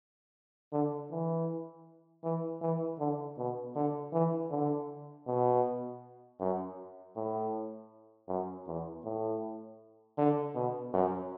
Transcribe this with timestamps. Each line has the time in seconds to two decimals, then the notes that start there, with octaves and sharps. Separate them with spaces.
0.72 D3
1.11 E3
2.24 E3
2.62 E3
2.99 D3
3.37 B2
3.75 D3
4.13 E3
4.51 D3
5.27 B2
6.40 F#2
7.16 A2
8.28 F#2
8.67 E2
9.04 A2
10.18 D3
10.55 B2
10.93 F#2